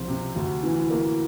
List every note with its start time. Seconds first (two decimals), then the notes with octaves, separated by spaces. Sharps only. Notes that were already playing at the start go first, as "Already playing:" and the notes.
Already playing: C2 F3 C4
0.08 C3
0.36 D2
0.63 E3
0.90 A#3